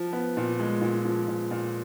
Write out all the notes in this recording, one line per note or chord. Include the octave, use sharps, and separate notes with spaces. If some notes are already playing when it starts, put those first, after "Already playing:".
Already playing: F3
B3
A#2
G#3
A#2
F3
A#2
A#2